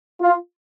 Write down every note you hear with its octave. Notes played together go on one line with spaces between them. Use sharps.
F4